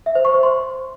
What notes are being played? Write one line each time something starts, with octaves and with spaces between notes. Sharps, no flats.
E5
C5
C#6
C5
C6